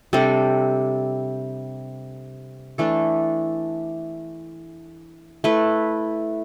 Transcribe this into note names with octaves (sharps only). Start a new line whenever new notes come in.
C3 G3 D4 A4
E3 A3 D4 A4
A3 E4 B4